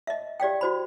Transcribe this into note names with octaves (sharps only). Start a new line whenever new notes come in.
D#5 E5
G4 D5 F5 G5
F#4 C5 B5